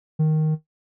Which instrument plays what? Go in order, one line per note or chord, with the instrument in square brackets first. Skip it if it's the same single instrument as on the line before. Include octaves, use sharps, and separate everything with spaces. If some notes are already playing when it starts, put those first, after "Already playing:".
[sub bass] D#3